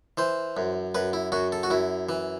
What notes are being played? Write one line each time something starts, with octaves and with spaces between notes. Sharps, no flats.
E3 C5
F#2
F#2 B4
E4
F#2 F#4
A4
F#4
F#2 E4
E3